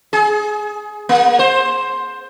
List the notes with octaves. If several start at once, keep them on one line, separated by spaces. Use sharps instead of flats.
G#4
A#3
C5